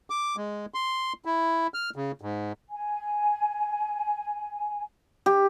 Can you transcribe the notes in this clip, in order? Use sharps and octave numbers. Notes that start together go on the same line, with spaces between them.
D6
G#3
C6
E4
F6
C#3
G#2
G#5
G4